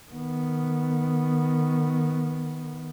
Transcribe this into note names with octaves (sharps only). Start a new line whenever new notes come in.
D#3 B3